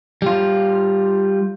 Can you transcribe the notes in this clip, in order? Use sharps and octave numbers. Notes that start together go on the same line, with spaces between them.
G3 F4